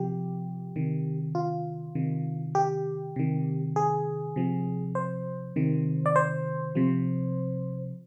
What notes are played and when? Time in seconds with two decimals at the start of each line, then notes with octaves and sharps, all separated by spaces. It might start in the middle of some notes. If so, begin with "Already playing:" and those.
Already playing: C3 F3 G4
0.76 C3 D#3
1.35 F4
1.95 C3 D#3
2.55 G4
3.16 C3 D#3
3.76 G#4
4.36 C3 F3
4.95 C5
5.56 C3 D#3
6.06 D5
6.16 C5
6.75 C3 F3